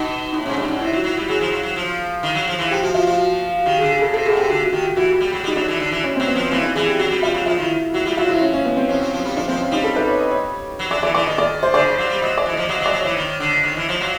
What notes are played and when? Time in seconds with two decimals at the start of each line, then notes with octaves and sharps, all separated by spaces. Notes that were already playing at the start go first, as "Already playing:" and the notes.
Already playing: B2 D#4
0.33 A2 D#4
0.44 G#2 C#4
0.57 G2 D4
0.68 F#2 D#4
0.81 C3 E4
0.92 F#3
0.96 F#4
1.04 F#3
1.13 F#4
1.17 G3
1.28 F#3 G#4
1.41 F3
1.51 F#3
1.63 F#3
1.76 F3
2.23 D#3
2.35 F#3
2.48 F3
2.59 E3
2.71 F3 G4
2.82 F3 F#4
2.94 F3 F4
3.07 F3 F#4
3.66 D#3 G4
3.78 G#4
3.81 D3
3.89 G#4
3.98 C#3 A4
4.13 C3 A4
4.25 B2 G#4
4.37 C3 G4
4.49 D3 F#4
4.61 F#4
4.73 D#3 G4
4.85 F#4
4.96 E3 F#4
5.20 G3
5.33 F#3
5.44 G3 D#4
5.55 F#3 D4
5.68 E3
5.80 D3
5.91 E3
6.04 C#4
6.16 C4
6.20 F#3
6.27 B3
6.35 F3
6.51 E3 C4
6.63 D4
6.75 E3 G#4
6.87 G4
6.99 F#3 F#4
7.10 G3
7.22 G3 F4
7.34 F#3
7.46 F3 F4
7.58 D#3 E4
7.94 F#3 F#4
8.06 G3 F#4
8.17 F#3 F4
8.29 F3 E4
8.41 C#4
8.54 C#4
8.65 B3
8.77 C4
8.89 F3 C#4
9.01 F#3
9.13 F3
9.25 G3
9.37 F3 D4
9.48 F3 C4
9.60 C#4
9.71 G3 D#4
9.84 A4
9.96 B4
10.08 C#5
10.19 D#5
10.31 C#5
10.79 F#3
10.91 F#3 D5
11.02 E3 D5
11.14 E3 D5
11.26 D#3 D#5
11.38 D5
11.63 C5
11.74 D3 D5
11.85 C#3
11.98 F#3
12.10 G3
12.22 F#3 D#5
12.38 D5
12.46 E3
12.53 D#5
12.57 F3
12.69 F#3 D#5
12.80 F#3
12.86 D5
12.93 F#3
13.01 E3 C#5
13.17 D#3
13.40 D3
13.64 D#3
13.77 E3
13.89 F3
14.01 F#3